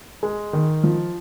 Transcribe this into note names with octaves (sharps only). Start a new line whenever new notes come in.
G#3
D#3
F3